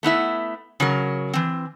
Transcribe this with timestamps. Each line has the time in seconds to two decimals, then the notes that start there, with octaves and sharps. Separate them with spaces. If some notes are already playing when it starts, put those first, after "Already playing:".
0.03 A3 B3 E4 E5
0.80 C#3 F#3 A#4
1.33 E3 C4